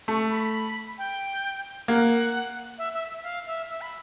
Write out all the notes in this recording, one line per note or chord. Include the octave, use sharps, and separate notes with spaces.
A3 C#6
B5
G5
A#3 F#5
E5
E5
E5
F5
E5
E5
B5